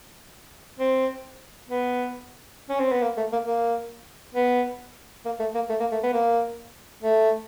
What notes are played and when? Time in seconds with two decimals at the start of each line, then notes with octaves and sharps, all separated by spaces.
0.79 C4
1.69 B3
2.69 C#4
2.79 C4
2.92 B3
3.03 A#3
3.17 A3
3.32 A#3
3.47 A#3
4.35 B3
5.25 A#3
5.40 A3
5.55 A#3
5.69 A3
5.80 A#3
5.92 A3
6.03 B3
6.13 A#3
7.03 A3